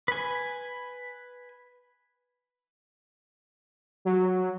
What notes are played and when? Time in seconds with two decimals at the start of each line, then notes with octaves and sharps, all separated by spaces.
0.08 B4 G#5
4.05 F#3